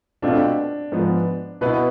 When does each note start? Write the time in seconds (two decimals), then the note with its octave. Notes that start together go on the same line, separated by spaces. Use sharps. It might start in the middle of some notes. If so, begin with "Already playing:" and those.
0.22 B2 A3 C4 D4 F4 A4
0.92 G#2 F3 B3
1.61 B2 B3 E4 B4